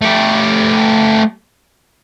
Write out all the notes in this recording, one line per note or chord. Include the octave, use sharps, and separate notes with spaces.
A3 G4